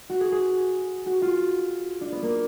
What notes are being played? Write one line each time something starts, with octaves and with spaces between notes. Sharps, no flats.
F#4
G#4
G#4
F#4
F4
D4
B3
A#3